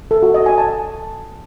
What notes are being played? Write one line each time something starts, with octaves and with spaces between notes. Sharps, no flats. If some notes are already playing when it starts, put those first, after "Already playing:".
A4
F#4
D#5
G#5
A5